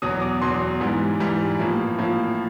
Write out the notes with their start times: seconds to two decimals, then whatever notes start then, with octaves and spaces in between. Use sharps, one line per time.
0.02 E2 B2 F#3 D#6
0.21 D6
0.41 E2 B2 F#3 C6
0.80 G#2 E3 G3
1.20 G#2 E3 G3 A#5
1.59 A2 F3 A#3
1.99 A2 F3 A#3